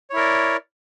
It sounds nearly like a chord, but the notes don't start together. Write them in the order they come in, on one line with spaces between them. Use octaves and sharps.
C#5 E4 A#4 D5